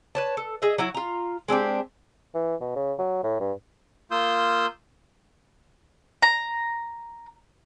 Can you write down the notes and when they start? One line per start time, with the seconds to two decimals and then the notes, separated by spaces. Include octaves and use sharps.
0.15 B4 C#5 A5
0.37 A4
0.62 G#4 D#5 E5
0.78 F#3 E4 F#4
0.94 F4 A#5
1.48 G#3 C4 D4 G4
2.35 E3
2.61 B2
2.76 C#3
2.99 F#3
3.24 A2
3.40 G2
4.11 A#3 F4 C6 D#6 E6 G6
6.22 A#5